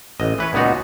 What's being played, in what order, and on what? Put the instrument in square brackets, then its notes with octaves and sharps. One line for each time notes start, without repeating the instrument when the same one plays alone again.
[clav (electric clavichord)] A1 D#5
E3 B4 C#5
C#2 A#2 B3 D#4 F#4